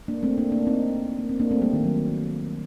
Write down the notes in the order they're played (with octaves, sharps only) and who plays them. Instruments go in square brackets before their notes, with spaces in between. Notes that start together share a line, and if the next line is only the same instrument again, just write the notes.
[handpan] A#3 D4
A3 C4
A#3 D4
A#3 D4
C4 D#4
A#3
C4
A#3 D4
A3 C4
G3 A#3
D#3
F#3